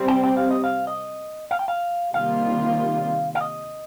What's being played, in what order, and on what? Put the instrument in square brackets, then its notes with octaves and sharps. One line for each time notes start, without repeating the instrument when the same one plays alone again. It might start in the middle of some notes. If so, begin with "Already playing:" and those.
Already playing: [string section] C3 G3 C4
[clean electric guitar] G5
G5
F5
D#5
F5
D#5
F5
G5
F5
[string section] C3 D#3 G3 A#3 F4 [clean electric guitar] F5
[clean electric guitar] F5
D#5